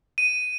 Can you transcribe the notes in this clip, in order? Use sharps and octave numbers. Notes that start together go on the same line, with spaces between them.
D#7